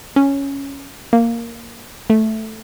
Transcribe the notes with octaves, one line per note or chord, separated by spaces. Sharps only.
C#4
A#3
A3